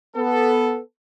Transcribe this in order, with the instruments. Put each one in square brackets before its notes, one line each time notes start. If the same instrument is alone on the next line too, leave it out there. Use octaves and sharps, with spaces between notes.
[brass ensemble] B3 A4